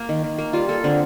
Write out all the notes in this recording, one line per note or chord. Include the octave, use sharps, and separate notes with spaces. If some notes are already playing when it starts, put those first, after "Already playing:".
Already playing: A#3
D#3
D#3
A#3
G3 F4
A#3 A4
D3 C4